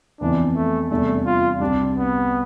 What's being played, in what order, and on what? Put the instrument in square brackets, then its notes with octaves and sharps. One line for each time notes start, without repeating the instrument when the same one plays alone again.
[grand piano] F2 E3 B3 [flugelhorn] D4
[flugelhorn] A3
[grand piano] E2 C3 G3 D4 [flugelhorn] A3
[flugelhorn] F4
[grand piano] C2 C3 G3 [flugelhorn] D4
[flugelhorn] B3